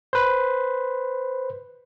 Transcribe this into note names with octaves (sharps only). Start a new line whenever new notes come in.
B4 C5